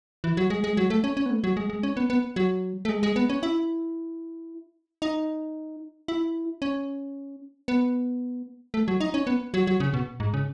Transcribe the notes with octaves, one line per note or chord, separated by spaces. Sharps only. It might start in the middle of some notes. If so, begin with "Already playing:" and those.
E3
F#3
G#3
G#3
F#3
A3
C#4
C#4
B3
A3
F#3
G#3
G#3
C#4
B3
B3
F#3
A3
G#3
G#3
B3
C#4
E4
D#4
E4
C#4
B3
A3
F#3
D#4
C#4
B3
F#3
F#3
C#3
B2
G#2
C#3